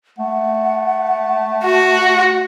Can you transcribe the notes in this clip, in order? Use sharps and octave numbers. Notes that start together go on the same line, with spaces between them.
A3 F#5
F#4